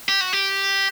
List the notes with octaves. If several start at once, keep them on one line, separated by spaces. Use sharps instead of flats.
G4
F#4
G4